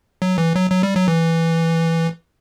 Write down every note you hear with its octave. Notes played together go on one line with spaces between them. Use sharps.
F#3
E3
F#3
F#3
G3
F#3
E3